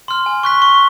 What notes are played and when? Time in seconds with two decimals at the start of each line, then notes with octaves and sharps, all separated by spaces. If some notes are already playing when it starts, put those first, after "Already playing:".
0.08 C6 F6
0.26 G#5
0.43 C#6 F#6 B6
0.62 C#6